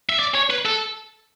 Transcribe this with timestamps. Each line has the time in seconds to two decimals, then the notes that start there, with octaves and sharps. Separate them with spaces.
0.09 E5
0.19 D5
0.35 C#5
0.50 B4
0.66 A4